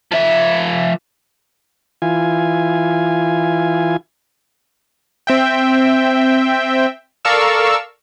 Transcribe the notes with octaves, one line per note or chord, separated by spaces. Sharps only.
F3 E5
E3 F4 G#5
C4 E5 G5
A4 A#4 D5 F5 C#6 E6